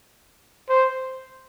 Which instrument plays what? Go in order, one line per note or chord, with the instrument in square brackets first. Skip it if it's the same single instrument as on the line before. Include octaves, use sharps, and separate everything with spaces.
[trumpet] C5